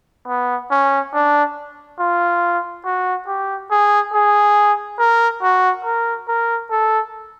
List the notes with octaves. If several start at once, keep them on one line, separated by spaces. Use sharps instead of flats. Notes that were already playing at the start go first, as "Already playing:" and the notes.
B3
C#4
D4
F4
F#4
G4
G#4
G#4
A#4
F#4
A#4
A#4
A4